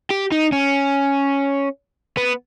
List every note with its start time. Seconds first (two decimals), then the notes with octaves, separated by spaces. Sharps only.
0.11 G4
0.32 D#4
0.52 C#4
2.17 B3